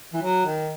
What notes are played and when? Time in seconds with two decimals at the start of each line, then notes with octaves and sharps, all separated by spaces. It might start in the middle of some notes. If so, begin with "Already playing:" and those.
0.13 E3
0.22 F#3
0.46 D#3